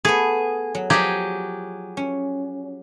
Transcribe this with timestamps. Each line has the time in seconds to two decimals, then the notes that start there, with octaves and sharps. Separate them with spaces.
0.05 A3 B3 G#4
0.75 F#3
0.90 F3 F#3 G4 G#4 D5 E5
1.97 C#4